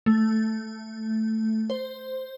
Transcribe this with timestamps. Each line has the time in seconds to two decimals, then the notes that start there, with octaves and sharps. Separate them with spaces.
0.06 A3
1.70 C5